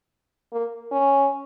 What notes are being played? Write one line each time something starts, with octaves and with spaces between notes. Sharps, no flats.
A#3
C#4